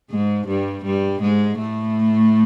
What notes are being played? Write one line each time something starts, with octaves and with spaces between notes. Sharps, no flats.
G#2 G#3
G2 G3
G2 G3
G#2 G#3
A2 A3